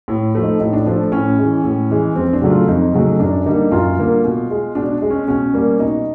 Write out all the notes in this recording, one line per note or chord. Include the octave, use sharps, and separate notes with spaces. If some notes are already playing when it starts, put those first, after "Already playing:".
A2
F3 A3
D#4
A2 D#4
D4
F3 A3 D4
A2 C#4
E3 G#3
A2
E3 G#3
F2 C4
D4
C#3 F#3 A3
F4
F2 D#4
C#3 F#3 A3
F#2 D4
D3 G3 A#3 D#4
F#2 F4
D3 G3 A#3
B2
G#3
B2 D4
G#3
C#4
B2 C#4
G3 A#3
B2 D#4